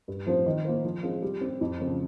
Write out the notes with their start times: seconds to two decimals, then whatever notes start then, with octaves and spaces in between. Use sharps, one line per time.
0.08 G2
0.27 F3 C4 F4 C5
0.46 D#3
0.65 A#3 F4 C5
0.85 F3
1.03 G#3 C4 F4
1.22 G3
1.41 C4 G4
1.61 F2
1.80 C#3 F3 C4